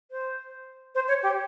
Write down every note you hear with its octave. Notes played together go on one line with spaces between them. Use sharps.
C5
C5
C#5
G4